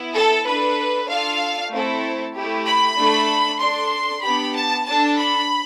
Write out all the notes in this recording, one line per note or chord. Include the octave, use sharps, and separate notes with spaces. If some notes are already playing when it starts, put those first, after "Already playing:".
Already playing: B3 E4
A4
D4 A4 B4
D4 F4 A4 F5
A3 C4 E4 A4
A3 E4 G4
B5
A3 D4 A4
D4 A4 C6
B3 D4 G4 B5
A5
D4 A4 A5
B5